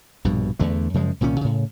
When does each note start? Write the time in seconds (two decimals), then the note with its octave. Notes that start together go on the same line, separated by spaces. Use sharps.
0.24 A#1 G2 B2
0.59 E2 D3 A3
0.94 F#2 C#3 F3 G#3
1.21 C2 A#2 D#3 C#4
1.41 A2 C#3